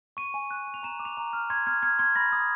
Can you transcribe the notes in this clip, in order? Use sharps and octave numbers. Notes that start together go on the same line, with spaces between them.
C#6 D#7
G#5
F#6
G#5
F7
A#5 E7
D6
F7
A#5
F6
C6 G#6
F6 G#6
F6 G#6
C6 G#6
B5 A#6
D#6